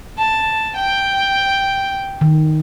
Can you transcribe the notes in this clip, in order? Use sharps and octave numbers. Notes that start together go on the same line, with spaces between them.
A5
G5
D#3